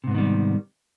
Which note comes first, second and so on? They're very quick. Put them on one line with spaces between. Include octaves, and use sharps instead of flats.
C3 G#2 B3 D#3 G3